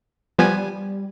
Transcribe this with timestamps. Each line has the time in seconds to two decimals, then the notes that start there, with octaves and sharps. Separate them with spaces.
0.39 F3 G3 B3 G#5